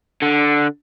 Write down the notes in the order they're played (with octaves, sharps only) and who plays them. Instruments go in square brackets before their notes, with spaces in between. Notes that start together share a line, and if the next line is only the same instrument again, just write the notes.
[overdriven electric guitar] D3